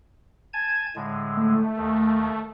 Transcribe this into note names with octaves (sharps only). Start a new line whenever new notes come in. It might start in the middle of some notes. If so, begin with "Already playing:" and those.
G#5 A5 G#6
A2 D3 G#3
A3
D#2 D#3